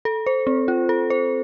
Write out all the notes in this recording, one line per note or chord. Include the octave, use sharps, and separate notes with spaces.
A4
C5
C4
F4
A4
C5